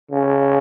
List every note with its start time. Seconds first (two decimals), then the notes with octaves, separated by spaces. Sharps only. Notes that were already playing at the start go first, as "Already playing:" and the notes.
0.11 C#3